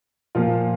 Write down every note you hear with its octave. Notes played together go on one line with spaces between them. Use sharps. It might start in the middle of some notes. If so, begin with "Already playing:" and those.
A#2 F3 F4